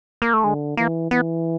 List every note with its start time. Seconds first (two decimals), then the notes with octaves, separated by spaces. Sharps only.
0.22 A#3
0.33 A3
0.44 D3 G#3
0.77 E3 A#3
1.11 E3 B3